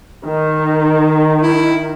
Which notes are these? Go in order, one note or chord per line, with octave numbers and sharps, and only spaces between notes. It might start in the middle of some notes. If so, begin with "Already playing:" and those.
D#3
E4